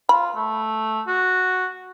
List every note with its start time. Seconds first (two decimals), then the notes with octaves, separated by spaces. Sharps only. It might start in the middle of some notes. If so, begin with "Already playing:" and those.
0.09 F4 B5
0.36 A3
1.07 F#4